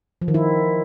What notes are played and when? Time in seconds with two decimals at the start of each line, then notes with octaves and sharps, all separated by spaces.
0.22 F3
0.28 D#3
0.34 E4